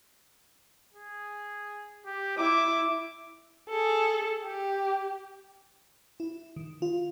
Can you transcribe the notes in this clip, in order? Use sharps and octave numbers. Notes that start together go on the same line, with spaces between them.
G#4
G4
E4 D6
G#4 A4
G4
E4
D#3
F4